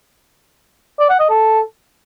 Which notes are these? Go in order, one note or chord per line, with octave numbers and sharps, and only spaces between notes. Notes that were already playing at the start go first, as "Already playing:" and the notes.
D5
F#5
D#5
A4